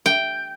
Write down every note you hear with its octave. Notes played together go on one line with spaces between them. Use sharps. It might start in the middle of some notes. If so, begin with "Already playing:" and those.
G5